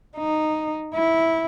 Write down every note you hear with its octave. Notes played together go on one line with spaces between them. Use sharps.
D#4
E4